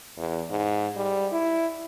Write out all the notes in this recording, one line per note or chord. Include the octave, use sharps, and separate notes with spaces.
E2
G#2
G3
E4